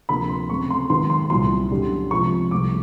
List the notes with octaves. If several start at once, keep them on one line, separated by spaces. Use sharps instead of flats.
D2 C3 F3 A#3 D4 B5
C6
C#3 F#3 A3 C4 C#6
C6
G#2 D#3 F#3 B3 C6
C6
C2 A#2 F#3 C6
F#2 D3 G3
C3 F3 G#3 C#6
C2 C3 F3 A3 D6